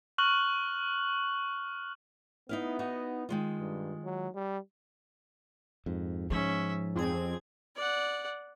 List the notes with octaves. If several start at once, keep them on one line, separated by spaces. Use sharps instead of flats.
C#6 F6 F#6 F#7
B3 D#4 E4 F5
D#4 F#4
D#3 G#3 F4
G2
F#3
G3
F2 G#2
G#2 F3 C#4 E5
F2 C4 G#4 G#6
D5 F#5